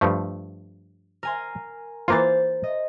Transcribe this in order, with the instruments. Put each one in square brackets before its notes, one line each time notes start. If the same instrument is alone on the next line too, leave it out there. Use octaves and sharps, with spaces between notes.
[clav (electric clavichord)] G2 F3 A3
[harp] A#4 G#5 C6
[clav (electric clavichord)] E3 A#3 F4 [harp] C5 A6
[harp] D#5